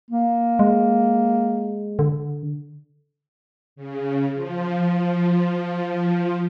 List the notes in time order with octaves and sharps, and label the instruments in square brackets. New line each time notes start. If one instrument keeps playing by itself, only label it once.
[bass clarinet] A#3
[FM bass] G#3
D3
[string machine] C#3
F3